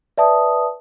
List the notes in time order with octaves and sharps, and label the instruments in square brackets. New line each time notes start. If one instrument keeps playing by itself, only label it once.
[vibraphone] B4 D#6 [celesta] D5 E5 A5